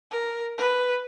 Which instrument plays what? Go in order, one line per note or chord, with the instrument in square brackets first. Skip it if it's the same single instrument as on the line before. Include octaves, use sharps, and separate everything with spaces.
[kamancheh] A#4
B4